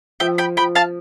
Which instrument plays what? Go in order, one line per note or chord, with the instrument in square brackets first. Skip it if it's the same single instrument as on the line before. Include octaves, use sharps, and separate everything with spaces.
[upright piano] F3 [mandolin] E5 G5
[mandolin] G5 B5
[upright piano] F3 [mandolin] G5 B5
[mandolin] F5 A5